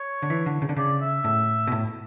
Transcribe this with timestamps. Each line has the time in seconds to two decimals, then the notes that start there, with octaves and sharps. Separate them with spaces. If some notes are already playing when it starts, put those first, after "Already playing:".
Already playing: C#5
0.22 D3
0.30 E3
0.46 D3
0.62 C#3
0.69 D3
0.77 C#3 D5
1.01 E5
1.24 A2
1.67 B2
1.72 A2